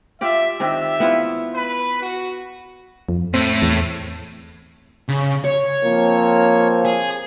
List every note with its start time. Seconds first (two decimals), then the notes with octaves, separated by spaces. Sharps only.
0.21 F4 G4 D5 E5
0.60 D#3 C4 D4 G4 E5
1.00 B3 E4 F4
1.53 B4
2.01 F#4
3.09 F2
3.34 A2 C4
3.62 E2
5.09 C#3
5.45 C#5
5.83 F3 A#3 C4
6.85 G#4